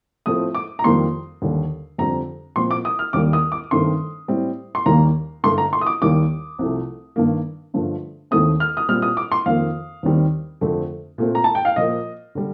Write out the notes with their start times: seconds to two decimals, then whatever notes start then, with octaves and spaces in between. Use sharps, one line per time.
0.26 A2 F3 A3 C4 D#6
0.55 D6
0.79 A#5
0.84 F2 D#3 G3 A#3 C6
1.42 D#2 D3 G3
1.98 F2 D3 G3 C4 A#5
2.56 A#2 F3 C4 C6
2.71 D6
2.85 D#6
2.99 F6
3.13 D#2 D#3 G3 A#3 D6
3.33 D#6
3.52 D6
3.71 G2 D#3 A3 C4 C6
4.28 A2 G3 C4
4.75 C6
4.86 D#2 D#3 G3 A#3 A#5
5.44 G2 D3 A3 C6
5.58 A#5
5.73 C6
5.81 D#6
5.86 D6
6.02 D#2 D#3 G3 A#3 D6
6.59 C2 C3 F3 A3
7.16 G2 D#3 A#3
7.74 G2 D3 F3 A3
8.31 D#2 D#3 A3 C4 D#6
8.60 F6
8.77 D#6
8.89 A#2 G3 C4 F6
9.02 D#6
9.17 D6
9.32 C6
9.46 F2 D#3 A#3 F5
10.03 D#2 D#3 G3 C4
10.61 F2 D3 A3 C4
11.18 A#2 A3 C4
11.35 A#5
11.44 A5
11.55 G5
11.65 F5
11.76 A#2 F3 A#3 D#5
12.35 D3 G3